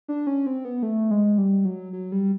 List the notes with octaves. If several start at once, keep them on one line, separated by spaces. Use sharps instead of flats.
D4
C#4
C4
B3
A3
G#3
G3
F#3
F#3
G3